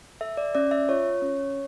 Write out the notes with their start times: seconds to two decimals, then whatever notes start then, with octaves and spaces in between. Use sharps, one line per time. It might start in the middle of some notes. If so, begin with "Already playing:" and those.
0.21 A4 E5
0.37 D5
0.55 C#4 D5
0.71 E5
0.89 F4 C#5
1.22 C#4